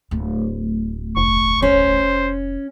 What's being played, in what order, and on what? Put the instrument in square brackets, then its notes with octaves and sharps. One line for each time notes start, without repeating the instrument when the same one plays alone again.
[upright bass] D1 A3
[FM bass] F1 [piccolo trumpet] C#6
[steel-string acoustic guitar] C#4 [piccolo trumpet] C5